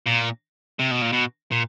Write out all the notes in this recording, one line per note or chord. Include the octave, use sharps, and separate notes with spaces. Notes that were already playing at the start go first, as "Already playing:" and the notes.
A#2
C3
B2
A#2
B2
A#2